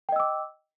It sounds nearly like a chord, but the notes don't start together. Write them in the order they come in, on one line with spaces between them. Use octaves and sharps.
G5 D#5 E6 D6